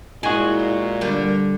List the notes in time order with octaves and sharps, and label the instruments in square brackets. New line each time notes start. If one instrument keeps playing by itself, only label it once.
[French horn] A#2 [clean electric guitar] G#3 F#4 [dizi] E4 [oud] G#4
[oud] D3 G3 [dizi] A#4